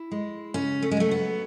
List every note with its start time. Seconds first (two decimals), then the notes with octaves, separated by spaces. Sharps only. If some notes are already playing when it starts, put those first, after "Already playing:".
Already playing: E4
0.11 G#3
0.54 C#3 C#4
0.83 A3
0.91 G#3
0.97 F#3 A3
1.11 B3